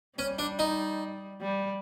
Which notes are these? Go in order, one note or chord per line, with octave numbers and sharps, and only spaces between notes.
G3 C#4
D4
D#4
G3